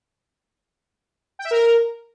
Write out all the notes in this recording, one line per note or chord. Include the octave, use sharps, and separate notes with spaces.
G5
E5
A#4